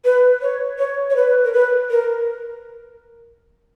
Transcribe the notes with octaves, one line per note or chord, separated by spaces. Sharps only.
B4
C#5
C#5
C#5
B4
A#4
B4
A#4